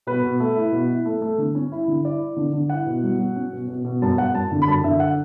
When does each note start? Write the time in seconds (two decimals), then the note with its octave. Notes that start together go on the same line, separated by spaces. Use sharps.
0.07 B2 B4
0.23 B2
0.40 A3
0.56 E4
0.72 B2
0.89 E4
1.05 A3
1.22 A3
1.38 D3
1.55 C#4
1.72 E4
1.88 D3
2.05 E4 D5
2.21 E4
2.37 D3
2.53 D3
2.70 E4 F#5
2.86 B2
3.04 F#3
3.19 F#3
3.36 C#4
3.53 B2
3.68 B2
3.85 B2
4.02 F#2 A5
4.17 F#2 F#5
4.34 F#2 A5
4.52 D3
4.62 B5
4.68 F#2 A5
4.83 D3 E5
5.00 F#5